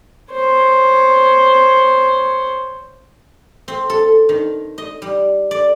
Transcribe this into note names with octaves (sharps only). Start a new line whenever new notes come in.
C5 C#5
C4
A4
D#3
D#5
G3
D5